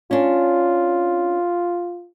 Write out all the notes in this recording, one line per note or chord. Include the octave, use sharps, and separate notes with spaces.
C#4 D4 F4